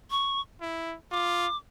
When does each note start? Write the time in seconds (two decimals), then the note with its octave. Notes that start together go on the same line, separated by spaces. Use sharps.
0.11 C#6
0.61 E4
1.12 F4 D6